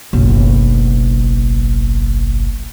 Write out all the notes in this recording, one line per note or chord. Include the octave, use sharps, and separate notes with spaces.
F#1 B1